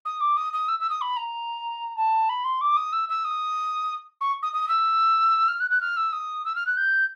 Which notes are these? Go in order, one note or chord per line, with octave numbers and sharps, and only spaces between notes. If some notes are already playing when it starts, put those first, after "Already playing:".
D#6
D6
D#6
D#6
E6
E6
D#6
B5
A#5
A5
B5
C6
D6
D#6
E6
E6
D#6
C#6
D#6
D#6
E6
F6
F#6
F#6
F6
E6
D#6
E6
F6
F#6
G6